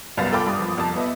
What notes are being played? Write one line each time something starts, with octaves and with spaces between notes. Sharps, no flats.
C2 F#2 B3 F5 A6
F4 A4 F5 G5 B5 D6
G2 D#6
F3
C2 F2 A5
B3 D#5 E5